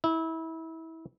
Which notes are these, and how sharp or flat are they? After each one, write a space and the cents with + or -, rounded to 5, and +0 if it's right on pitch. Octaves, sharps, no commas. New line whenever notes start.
E4 -25